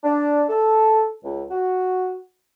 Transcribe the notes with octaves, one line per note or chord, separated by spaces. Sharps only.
D4
A4
C#2
F#4